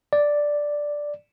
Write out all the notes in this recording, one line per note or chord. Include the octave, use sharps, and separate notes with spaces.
D5